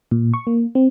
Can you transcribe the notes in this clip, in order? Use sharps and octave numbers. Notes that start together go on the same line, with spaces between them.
A#2
C#6
A#3
C4